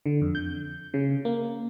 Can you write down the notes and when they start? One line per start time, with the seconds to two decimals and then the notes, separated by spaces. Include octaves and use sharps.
0.06 D3
0.22 F2
0.35 G6
0.94 C#3
1.25 A#3